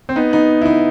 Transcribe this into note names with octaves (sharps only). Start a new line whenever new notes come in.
C4
B3 D#4
B3 D#4
E4
B3 D#4